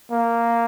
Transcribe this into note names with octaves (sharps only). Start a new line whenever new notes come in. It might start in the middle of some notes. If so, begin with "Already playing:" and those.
A#3